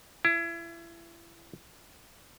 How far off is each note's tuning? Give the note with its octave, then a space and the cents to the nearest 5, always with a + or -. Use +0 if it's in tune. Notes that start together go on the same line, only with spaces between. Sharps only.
E4 +30